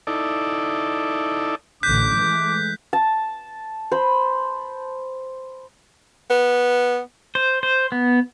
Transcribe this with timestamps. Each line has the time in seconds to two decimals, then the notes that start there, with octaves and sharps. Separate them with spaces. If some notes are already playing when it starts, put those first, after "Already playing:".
0.07 D#4 E4 A4 D5
1.83 A1 F#2 D3 D6 F#6 G6 B6
2.14 E3 G#3 A3
2.93 A5
3.91 C5 B5
6.30 B3
7.35 C5
7.63 C5
7.92 B3